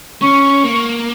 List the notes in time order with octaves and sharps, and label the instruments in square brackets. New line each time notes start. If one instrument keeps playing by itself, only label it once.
[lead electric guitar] C#4 [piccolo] C#6
[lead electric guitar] A#3